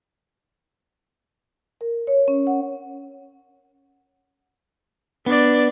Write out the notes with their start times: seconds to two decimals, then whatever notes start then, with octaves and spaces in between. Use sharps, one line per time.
1.81 A#4
2.07 C#5
2.28 C#4
2.47 F#5
5.26 B3 D4 D5